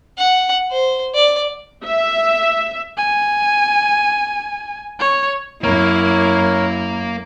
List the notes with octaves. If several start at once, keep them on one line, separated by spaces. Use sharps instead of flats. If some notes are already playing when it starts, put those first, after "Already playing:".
F#5
C5
D5
E5
G#5
C#5
F#2 A#3 E4 A#4 C#5